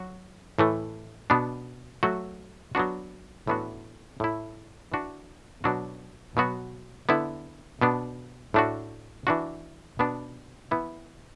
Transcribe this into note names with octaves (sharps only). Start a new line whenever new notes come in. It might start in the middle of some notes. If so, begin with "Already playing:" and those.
Already playing: F#3 F#4
A2 E3 A3
B2 B3 D4
F#3 A3 F#4
F#3 B3 D4 F#4
A2 E3 B3 D4 F#4
A2 A3 E4
E3 D4 F#4
B2 F#3 D4 F#4
B2 F#3 B3 F#4
D3 B3 E4
B2 B3 D4
A2 A3 D4 F#4
E3 D4 F#4
B2 B3 D4
E3 B3 E4